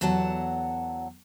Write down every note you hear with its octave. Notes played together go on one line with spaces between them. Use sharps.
E2 F#3 A4 C#5 F#5 A5